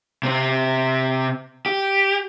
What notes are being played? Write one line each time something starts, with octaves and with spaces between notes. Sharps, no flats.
C3 C4
G4